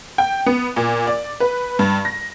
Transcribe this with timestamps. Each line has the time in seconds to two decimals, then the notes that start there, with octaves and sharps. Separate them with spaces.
0.18 G5
0.46 B3
0.76 A#2
1.07 D5
1.40 B4
1.79 G2
2.05 A#6